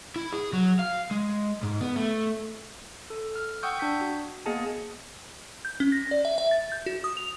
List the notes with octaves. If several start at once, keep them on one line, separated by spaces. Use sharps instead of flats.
E4
G#4
F#3
F5
G#3
G#2
B3
A3
A4
F6
F#5 G5 C#6 D#6 E6 G6
D4 G6 B6
F#4
A#3 B3 G#4 D#5 G#5 A5
G6
C#4
A#6
D5
E5
E5
A6
G6
F#4
D#6
F7